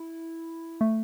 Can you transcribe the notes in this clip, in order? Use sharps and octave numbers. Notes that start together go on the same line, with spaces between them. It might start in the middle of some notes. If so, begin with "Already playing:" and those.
Already playing: E4
A3